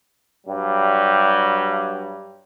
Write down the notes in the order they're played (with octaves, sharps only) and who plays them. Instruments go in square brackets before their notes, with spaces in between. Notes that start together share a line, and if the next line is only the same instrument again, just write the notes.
[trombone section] G2 F#3 G3